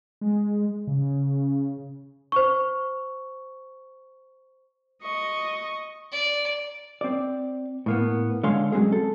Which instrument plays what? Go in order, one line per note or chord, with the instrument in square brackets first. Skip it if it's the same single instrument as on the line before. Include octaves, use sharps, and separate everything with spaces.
[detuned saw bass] G#3
C#3
[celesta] C5 C#6
[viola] D#5 C#6
[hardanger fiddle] D5
[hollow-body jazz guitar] C4 D5
A2 A#3 B3
D3 G#3 C#5 F5 C6
F#3 G#3 A3 C4 C#4 G#4
A4